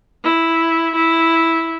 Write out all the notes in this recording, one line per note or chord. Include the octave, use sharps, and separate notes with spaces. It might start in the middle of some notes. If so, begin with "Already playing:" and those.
E4
E4